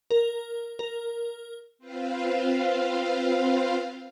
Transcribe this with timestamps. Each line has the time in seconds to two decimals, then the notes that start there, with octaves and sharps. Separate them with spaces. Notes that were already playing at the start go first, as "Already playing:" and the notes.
0.11 A#4
0.79 A#4
1.79 C4 F4 B4 C5 F5